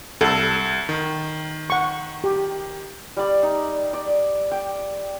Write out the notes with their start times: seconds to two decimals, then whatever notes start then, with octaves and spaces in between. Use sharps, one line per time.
0.21 C2 A4
0.89 D#3
1.70 F#5 C#6
2.24 G4
3.17 G3 D5
3.43 D#4
3.93 D5
4.51 G5